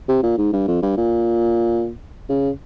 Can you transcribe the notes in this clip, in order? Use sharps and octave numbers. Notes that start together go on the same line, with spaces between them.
C3
A#2
G#2
G2
F2
G2
A#2
C#3